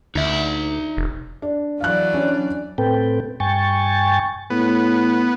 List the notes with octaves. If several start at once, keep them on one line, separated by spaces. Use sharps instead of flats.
D2 D#4 E5
F1
D4
E3 F#3 D5 F5 F#6
C#4 D4
A2 C4 A4 B4 G5
G2 G5 G#5 C#6 A6
A2 B3